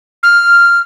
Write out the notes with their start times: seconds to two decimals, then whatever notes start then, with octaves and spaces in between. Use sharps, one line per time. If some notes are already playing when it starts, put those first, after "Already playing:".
0.23 F6